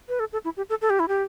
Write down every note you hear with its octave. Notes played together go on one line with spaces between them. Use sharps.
B4
A4
A4
E4
G4
A4
A4
G4
E4
G4